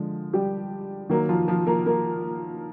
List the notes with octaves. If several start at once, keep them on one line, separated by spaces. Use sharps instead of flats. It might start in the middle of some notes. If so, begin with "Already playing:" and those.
Already playing: D3 F3 G#3
G3 G4
D#3 F#3 A#3
F3 F4
F3 F4
A#3 A#4
A#3 A#4